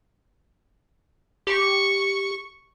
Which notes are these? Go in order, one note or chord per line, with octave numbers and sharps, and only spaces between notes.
G4 C#6